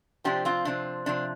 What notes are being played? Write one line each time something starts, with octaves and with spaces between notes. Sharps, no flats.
C3 F3 C4 D4 G4
C4 F4
C3 F3 C4 D4
C3 F3 C4 D4